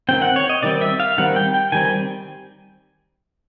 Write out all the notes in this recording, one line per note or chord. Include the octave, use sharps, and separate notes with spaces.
D#3 G3 C4 G5
F#5
C#5
D#5
D#3 G3 C4 D5
E5
F5
D#3 G3 C4 F#5
G5
G5
D#3 G3 C4 G#5